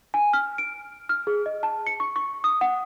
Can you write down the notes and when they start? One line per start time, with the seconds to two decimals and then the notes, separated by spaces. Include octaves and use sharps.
0.14 G#5
0.33 F6
0.58 D7
1.09 F6
1.27 G#4
1.46 D#5
1.63 A5
1.87 C#7
2.00 C#6
2.16 C#6
2.44 D#6
2.61 F#5